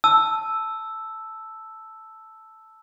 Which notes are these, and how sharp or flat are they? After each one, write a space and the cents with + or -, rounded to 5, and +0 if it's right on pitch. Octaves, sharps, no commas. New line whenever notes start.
A5 +0 E6 +0